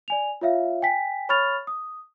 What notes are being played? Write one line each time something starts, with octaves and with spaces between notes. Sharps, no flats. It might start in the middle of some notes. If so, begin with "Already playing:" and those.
D5 G#5 F7
F4 C#5 E5 F5
G5 G#5 B6
C#5 B5 C#6 F6 A6 F7
D#6